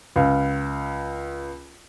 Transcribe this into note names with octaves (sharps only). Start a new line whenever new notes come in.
C#2 F5